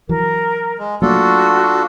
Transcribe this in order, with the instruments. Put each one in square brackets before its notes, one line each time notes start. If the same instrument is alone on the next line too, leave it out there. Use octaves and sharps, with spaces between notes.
[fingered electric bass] E3 F#3 [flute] A#4
[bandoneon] G#3
[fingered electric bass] F#3 A3 A#3 [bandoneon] D4 F4 A4 [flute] F#4